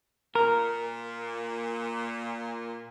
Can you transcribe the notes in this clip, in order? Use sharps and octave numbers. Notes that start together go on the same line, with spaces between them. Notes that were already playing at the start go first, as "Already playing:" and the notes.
A#2 A#4